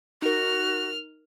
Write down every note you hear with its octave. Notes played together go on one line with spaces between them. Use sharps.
D#4 F#4 A#4 F6